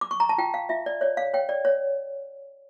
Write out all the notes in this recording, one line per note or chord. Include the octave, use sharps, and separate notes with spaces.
D6
C#6
A#5
A5
F4 G5
F5
F4 E5
D5
C#5 D5
F5
C#5 G5
D5
C#5